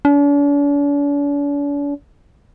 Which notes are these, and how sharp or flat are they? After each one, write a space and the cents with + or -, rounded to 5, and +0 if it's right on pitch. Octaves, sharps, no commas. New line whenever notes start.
D4 -45